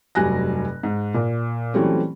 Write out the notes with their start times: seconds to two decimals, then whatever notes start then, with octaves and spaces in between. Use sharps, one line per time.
0.15 F1 G2 F#3 G#5 F#6 A#6
0.83 G#2
1.14 A#2
1.74 E3 F#3 G3 A3 C4 C#4